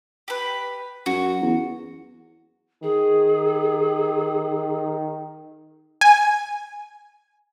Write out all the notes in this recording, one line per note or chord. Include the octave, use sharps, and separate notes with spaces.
G4 B4
F#2 F#4
E2
D#3 G#4
G#5